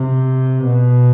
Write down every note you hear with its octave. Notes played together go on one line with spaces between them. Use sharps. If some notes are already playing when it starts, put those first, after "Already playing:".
Already playing: C3
B2